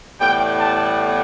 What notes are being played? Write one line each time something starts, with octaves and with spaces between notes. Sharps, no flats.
A2 E3 G3 B3 G5
A5